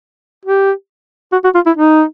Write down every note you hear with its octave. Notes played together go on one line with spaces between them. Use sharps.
G4
F#4
F#4
F4
E4
D#4